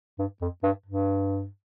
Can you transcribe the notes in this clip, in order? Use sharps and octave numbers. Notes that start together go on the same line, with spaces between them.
G2
F2
G2
G2